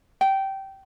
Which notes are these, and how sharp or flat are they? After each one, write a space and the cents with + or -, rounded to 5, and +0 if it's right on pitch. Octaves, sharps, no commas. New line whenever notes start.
G5 -15